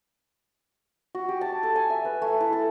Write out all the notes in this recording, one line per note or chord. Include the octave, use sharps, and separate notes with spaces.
F#4
G4
A5
A4
G#5
E5
B4
A3
E4
A4